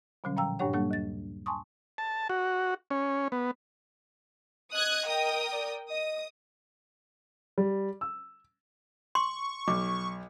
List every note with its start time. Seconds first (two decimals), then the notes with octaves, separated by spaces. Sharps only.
0.24 B2 D3 F#3 G3 C#4
0.37 A#2 F3 F5 G5 A#5 E6
0.59 G2 A#2 D4 G4 C#5 F#5
0.73 F#3 G3 A#3 D4 A4 F#5
0.91 D#2 A6
1.46 G#5 A5 C6 C#6 D#6
1.98 A5
2.29 F#4
2.91 C#4
3.32 B3
4.72 D#5 D#6 F#6 G#6
5.07 A#4 G5 D#6
5.52 D5
5.90 D#5 D#6
7.58 G3
8.01 E6
9.15 C6 C#6
9.68 B1 D6